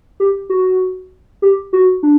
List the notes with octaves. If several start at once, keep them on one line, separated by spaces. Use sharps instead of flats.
G4
F#4
G4
F#4
D4